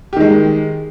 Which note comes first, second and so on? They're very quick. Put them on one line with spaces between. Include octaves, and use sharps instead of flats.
G4 D#3 G#3